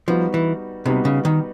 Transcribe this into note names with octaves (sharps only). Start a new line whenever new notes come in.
F3 G3 B3 D#4 F#4 B4
E3
C3 G3 B3 D#4 F#4 B4
C#3
D#3